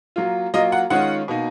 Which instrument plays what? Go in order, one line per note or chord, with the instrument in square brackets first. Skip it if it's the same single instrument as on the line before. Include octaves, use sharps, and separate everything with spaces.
[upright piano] F#3 A#3 F4
F#3 A#3 F4 D#5
F#5
D#3 G#3 C#4 F4 F#5
B2 A#3 D#4